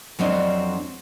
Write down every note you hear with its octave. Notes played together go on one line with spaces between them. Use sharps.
F2 F#3 C4 D4 D#5